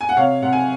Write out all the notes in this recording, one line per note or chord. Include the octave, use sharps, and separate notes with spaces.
G#5
F#5
C3 C#5 F5
C3 F#5
G#5